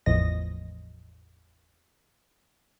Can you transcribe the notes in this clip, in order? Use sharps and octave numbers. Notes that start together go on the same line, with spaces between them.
G#1 E2 A2 F3 D#5 A#6